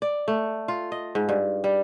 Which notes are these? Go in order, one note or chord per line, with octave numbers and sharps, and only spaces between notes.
D5
A3
F4
D#5
G#2
G2
G3